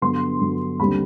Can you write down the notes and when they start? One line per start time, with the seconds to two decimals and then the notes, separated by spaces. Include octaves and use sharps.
0.02 G2 D3 F#3 B3 C6
0.40 G2 D3 F#3 B3
0.79 D#2 D3 G3 C4 B5